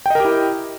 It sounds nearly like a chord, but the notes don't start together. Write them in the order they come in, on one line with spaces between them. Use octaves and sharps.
G5 D#5 A#4 G4 E4